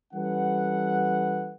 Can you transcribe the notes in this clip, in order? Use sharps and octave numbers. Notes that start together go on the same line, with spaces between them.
E3 G3 C#4 A4 B4 F#5